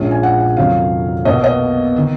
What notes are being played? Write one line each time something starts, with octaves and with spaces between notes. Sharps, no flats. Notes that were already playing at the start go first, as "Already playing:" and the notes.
Already playing: A#1 A#2 G#3 C#4 F4
G#5
F#5
F#5
F1 F2 D#3 F#3 C#4 F5
B1 B2 A#3 D#5
D#5
D#3